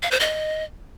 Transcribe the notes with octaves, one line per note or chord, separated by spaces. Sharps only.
F5
C5
D#5